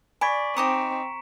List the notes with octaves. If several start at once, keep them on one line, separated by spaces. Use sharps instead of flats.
D5 G#5 B5 C#6 G#6 B6 D7
C4 D#4 A#5 D6 D#6 C#7 E7